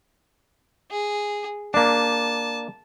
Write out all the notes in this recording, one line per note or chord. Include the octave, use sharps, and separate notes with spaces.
G#4
A#3 D4 A5